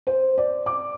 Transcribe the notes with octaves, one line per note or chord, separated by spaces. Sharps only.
C5
D5
D6